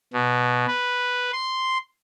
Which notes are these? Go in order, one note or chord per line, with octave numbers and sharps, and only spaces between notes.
B2
B4
C6